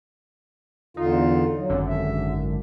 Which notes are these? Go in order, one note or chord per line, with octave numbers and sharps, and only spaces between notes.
E2 D3 D#4 F4
F#3
G#1 F#2 D3
E5